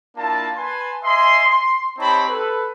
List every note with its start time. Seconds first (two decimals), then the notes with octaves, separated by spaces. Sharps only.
0.17 A#3 D4 E4 F4 A5
0.57 B4 G#5 A5 C6
1.04 D#5 E5 G#5 C6
1.45 C6
1.99 C4 D#4 G4 C#5 A5 B5
2.29 A4 B4